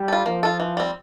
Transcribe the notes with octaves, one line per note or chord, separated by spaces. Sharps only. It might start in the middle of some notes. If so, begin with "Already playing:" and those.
Already playing: G3
F4 A4
F3 A#3
F4 A4
E3
G3 C4